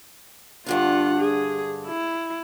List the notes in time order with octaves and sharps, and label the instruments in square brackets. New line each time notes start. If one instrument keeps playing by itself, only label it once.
[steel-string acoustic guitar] G2 D3 D4 [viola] F4 F#5
[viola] G#4
E4